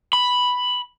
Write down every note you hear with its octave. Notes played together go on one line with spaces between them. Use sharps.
B5